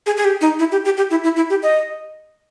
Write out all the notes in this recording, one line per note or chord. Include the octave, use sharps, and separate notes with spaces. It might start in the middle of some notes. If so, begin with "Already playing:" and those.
G#4
G#4
G4
D#4
E4
G4
G4
G4
E4
E4
E4
G4
D#5